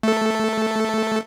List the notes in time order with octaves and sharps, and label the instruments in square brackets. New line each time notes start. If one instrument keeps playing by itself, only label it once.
[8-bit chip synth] A3 A4